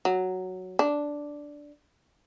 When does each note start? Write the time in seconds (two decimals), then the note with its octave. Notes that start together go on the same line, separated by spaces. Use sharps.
0.05 F#3
0.79 D4